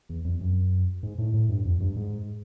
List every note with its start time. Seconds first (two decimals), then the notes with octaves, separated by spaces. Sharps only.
0.09 E2
0.25 F2
0.41 F#2
1.03 G#2
1.18 A2
1.34 A2
1.49 G2
1.65 F2
1.81 G2
1.96 G#2